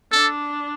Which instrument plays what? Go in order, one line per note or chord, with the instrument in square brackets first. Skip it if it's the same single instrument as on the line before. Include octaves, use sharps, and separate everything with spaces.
[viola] D4 [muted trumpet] A4